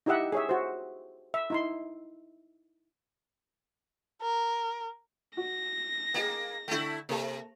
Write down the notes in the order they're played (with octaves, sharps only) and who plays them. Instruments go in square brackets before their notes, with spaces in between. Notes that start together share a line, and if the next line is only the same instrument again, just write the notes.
[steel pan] D#4 E4 G4 D#5 E5 F#5
G#4 C#5 E5
F#4 C5
E5
D#4 E4 C6
[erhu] A#4
[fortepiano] F#4 [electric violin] A#6
[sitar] A#3 [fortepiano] G#4 D#5 G5
[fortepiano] D3 G5 [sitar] A3 E4
[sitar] C3 [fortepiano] A#3 A4 A5